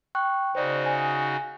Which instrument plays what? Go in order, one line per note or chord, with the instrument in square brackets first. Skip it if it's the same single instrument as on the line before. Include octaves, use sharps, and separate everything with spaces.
[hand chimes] G5 C#6 F#6
[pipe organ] C#3 D#4 F#4 [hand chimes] C5 D5
[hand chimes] G#5